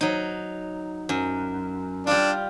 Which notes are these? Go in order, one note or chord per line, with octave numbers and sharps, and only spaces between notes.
F#3 D#4
F#2
G3 D4 F4